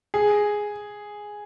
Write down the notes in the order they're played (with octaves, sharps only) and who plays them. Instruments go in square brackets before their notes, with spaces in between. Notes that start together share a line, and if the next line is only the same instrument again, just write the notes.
[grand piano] G#4